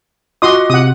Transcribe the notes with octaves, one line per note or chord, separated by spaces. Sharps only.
F4 F#4 D#5 C6 D6 D#6
C3 F#5 D#6